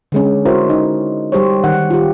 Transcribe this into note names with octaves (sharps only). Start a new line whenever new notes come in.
D3 G#3 C#4
E4 F#4 A#4 C5 C#5
D#4
G3 G4 C5 C#5
D#3 F#5
F4 G4